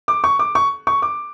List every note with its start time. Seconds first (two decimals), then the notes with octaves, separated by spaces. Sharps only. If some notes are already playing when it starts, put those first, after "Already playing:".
0.08 D6
0.24 C#6
0.39 D6
0.55 C#6
0.87 C#6
1.02 D6